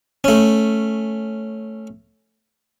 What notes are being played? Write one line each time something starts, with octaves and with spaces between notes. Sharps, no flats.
A3 C#4